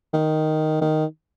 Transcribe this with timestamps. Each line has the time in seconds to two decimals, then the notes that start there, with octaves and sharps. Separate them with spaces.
0.13 D#3
0.81 D#3